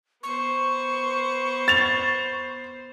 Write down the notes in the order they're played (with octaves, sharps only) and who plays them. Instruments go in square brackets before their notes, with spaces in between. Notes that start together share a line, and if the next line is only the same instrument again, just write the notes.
[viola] B3 C5 [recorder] C#6
[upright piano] A6 F7